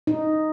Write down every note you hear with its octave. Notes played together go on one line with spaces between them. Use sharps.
D#4